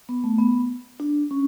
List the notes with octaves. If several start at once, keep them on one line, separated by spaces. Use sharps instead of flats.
B3
A3
B3
D4
C#4